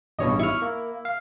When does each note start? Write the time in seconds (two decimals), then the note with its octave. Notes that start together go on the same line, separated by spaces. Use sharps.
0.19 A1 E2 G2 B2 C#5 D#5
0.39 E4 C#6 F6
0.62 A#3
1.05 F5